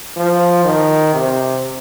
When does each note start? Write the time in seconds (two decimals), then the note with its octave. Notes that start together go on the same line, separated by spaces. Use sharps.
0.17 F3
0.65 D#3
1.14 C3